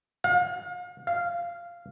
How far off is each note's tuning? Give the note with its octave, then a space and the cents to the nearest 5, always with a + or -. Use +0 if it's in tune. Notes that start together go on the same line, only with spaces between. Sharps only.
F5 +40
F5 -10